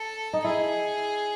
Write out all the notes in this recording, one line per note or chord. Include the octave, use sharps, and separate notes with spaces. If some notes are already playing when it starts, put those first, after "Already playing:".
Already playing: A4
D#4
E4 G#4